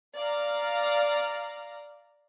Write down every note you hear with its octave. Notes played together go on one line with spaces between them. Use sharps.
D5 F5 A#5